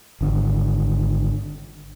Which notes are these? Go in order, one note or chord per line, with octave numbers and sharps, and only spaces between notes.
G#1 D3